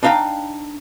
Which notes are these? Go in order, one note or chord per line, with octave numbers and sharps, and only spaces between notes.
D4 D#4 F5 G5 A#5